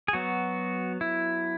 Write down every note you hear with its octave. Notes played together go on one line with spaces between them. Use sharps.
G#4
F#3 B3 F#4
E4